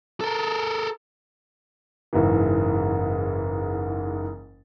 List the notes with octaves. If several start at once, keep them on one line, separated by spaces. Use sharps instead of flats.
A4 A#4
F#1 G#2 E3